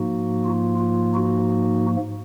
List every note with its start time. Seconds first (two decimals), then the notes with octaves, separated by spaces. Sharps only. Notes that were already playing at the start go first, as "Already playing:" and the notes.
Already playing: G#2 F3 A#3 D#4 F#4
0.45 F4
0.79 F4
1.13 D#4 F#4